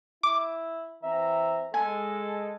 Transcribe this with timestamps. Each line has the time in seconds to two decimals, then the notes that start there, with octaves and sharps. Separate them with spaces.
0.23 E4 D6
1.03 E3 C4 E5 A#5
1.74 G#3 A4 G#5